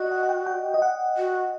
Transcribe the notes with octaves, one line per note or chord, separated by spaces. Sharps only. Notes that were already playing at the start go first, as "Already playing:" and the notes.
Already playing: F#4 D5 D#5
F#5
F#5
G5
G5
D#5
F#5
F#4